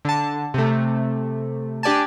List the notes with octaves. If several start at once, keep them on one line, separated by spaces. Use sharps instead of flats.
D3 A5
C3 A3
D4 G4 D5 G#5 A5